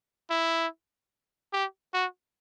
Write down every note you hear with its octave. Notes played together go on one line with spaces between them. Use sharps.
E4
G4
F#4